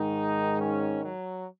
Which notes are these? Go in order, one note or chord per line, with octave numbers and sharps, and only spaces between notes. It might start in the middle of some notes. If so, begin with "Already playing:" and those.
Already playing: G#2 D#3 D#4
C#4
F#3